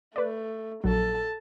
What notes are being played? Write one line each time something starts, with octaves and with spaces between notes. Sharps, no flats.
A3 B4 D5
A#1 F#3 A4 A5